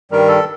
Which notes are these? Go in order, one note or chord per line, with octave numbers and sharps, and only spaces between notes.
G2 D#3 G3 A#4
A4